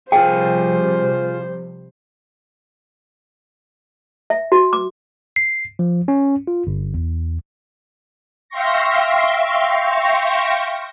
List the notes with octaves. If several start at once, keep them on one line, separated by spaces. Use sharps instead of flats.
C3 F3 G3 F4 G#4 C5 G5
E5
F#4
D6
C7
F3
C#4
F4
G1
E2
E5 F5 G5 C6 C#6 A#6